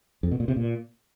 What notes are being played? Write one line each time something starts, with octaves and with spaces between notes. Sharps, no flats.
F2
B2
A#2
C3
A#2